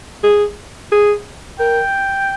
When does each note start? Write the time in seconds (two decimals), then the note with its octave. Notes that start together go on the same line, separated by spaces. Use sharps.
0.23 G#4
0.92 G#4
1.60 A#4 G5